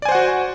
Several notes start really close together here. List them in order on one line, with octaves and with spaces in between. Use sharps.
D5 G#5 C5 F#5 F#4